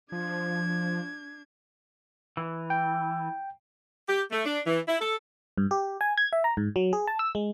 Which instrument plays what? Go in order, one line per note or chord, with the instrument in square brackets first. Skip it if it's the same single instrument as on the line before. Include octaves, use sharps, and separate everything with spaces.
[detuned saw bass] F3 [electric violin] D4 G#6
[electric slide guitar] E3
[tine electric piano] G5
[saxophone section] G4
A3
D4
E3
E4
A4
[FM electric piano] G2
G4
G#5
G#6
E5
A#5
G#2
F#3
G#4
A5
E6
G#3